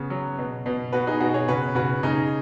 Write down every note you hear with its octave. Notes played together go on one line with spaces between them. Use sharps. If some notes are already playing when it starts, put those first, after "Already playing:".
Already playing: C#3 B3
F#3
B2
B2
B2 F#4 B4
D#4 G#4
B2 F#4
G#4 C#5
C#3 F#4 B4
C#3 F#4 B4
C#3 D#4 G#4